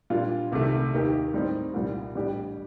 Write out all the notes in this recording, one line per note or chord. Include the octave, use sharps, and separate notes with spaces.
A#2 G3 D4 F4
C2 C3 D#3 A3
D#2 D#3 A#3 D#4 G4
A2 G3 C4 D#4
C2 A#2 G3
A1 A2 G3 D4 G4